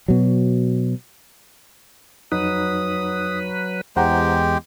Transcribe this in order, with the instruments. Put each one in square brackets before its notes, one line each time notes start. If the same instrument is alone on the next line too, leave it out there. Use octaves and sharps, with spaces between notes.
[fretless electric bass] B2 F#3
[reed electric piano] F2 D#4 [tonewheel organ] F#3 B4 [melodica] D#6
[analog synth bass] E2 [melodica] G#3 G4 G5 [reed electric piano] C5 F#5 A#5